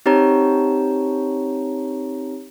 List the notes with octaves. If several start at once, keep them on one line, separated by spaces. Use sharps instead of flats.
C4 D#4 G4 C#5 A#5